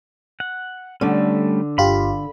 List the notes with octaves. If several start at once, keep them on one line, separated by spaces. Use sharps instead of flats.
F#5
D3 G3 A3 C#4
G1 F4 G4 B5